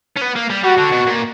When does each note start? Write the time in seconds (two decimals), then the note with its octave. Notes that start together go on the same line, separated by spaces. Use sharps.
0.16 C#4
0.21 B3
0.35 A#3
0.50 G3
0.63 G3 F#4
0.78 D3
0.92 B2
1.06 A#2